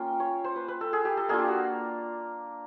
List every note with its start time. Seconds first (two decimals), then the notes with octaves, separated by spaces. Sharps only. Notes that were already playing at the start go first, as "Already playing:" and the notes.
Already playing: A#3 C#4 F4 G5
0.20 C#5
0.44 C5
0.56 B4
0.68 B4
0.81 A4
0.93 G#4
1.05 G4
1.17 A4
1.29 A#3 D4 F4 G#4
1.38 G4
1.48 F#4